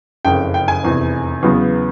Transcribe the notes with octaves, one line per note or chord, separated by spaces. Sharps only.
F#1 F2 C#3 G5
G5
G#5
F1 E2 C3
E2 C#3 F#3 B3